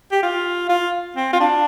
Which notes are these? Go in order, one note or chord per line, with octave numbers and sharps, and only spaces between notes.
G4
F4
F4
C4
F4
D4